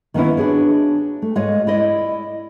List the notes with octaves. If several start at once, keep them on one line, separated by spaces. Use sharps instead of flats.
D#3 A#3 B3 C#4 E4
D4 F#4 G#4 C#5
A3
G#2 G#3 F4 C#5 D#5
E4 D5 D#5